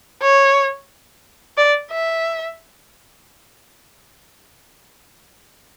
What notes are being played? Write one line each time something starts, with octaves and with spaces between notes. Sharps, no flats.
C#5
D5
E5